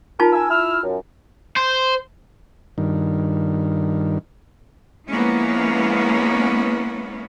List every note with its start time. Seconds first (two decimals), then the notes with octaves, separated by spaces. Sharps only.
0.20 D#4 F4 A#4 A5
0.33 A#4 G#5 E6
0.50 E4 E6 F6
0.84 F#2
1.57 C5
2.78 G2 D#3
5.07 F3 G#3 A#3 B3 C#4 E4